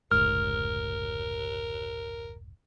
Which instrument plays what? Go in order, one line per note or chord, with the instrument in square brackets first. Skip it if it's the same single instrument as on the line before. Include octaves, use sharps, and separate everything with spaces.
[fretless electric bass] F1 C#2 G#2 [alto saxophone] A#4 [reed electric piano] F6